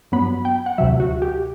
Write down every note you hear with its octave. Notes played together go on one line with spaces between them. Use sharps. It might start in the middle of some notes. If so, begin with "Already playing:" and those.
G2 F#3 B3 B5
G5
F#5
D2 C3 F#3 E5
F#4
G4